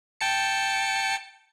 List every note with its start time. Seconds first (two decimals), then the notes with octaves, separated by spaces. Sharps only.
0.21 G5 A5 C#7